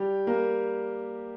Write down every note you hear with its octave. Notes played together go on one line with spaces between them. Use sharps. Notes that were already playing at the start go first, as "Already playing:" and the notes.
Already playing: G3 G4
A#3 A#4